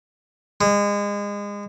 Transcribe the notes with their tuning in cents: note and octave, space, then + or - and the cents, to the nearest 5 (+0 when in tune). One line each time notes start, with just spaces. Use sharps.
G#3 -30